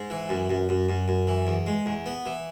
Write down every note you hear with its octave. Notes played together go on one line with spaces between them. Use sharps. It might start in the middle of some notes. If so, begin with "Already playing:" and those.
Already playing: G#2
E3
F#2
F#2
F#2
F#2
F#2
E3
E2
G#3
E2
B3
E3